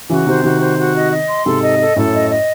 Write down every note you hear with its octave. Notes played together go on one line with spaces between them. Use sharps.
C#3 E3 F#4
C3 D#3 C5
C3 D#3 F#4
C5
F#4
D#5
D#5
C6
G#2 C3 A4
D#5
A4
F#2 A2 A4
D#5
D#5